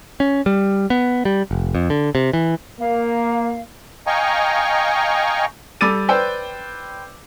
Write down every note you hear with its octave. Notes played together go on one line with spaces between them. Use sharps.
C#4
G3
B3
G3
F1
F2
D3
C3
E3
A#3 F5
D#5 F5 G5 G#5 A#5 C#6
G3 A4 D6 E6 A6 D#7
B4 C5 D5 G5 E6